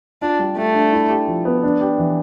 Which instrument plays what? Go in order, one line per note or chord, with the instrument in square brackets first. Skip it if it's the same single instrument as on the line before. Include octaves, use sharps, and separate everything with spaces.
[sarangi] D4 [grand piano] F4
[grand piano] G3
[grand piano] G3 [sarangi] A3
[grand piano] D4
E4
G4
F3
B3
D4
G4
E3